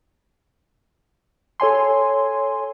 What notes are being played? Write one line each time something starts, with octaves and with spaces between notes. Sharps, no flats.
A4 C#5 G#5 C6